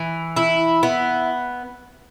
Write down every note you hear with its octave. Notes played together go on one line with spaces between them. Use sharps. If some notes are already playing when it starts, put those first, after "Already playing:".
Already playing: E3
E4
B3